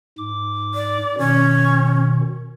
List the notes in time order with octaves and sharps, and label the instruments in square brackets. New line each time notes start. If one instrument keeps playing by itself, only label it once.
[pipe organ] G#2 D6
[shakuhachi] D5
[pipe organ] B2 D#3 [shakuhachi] C#4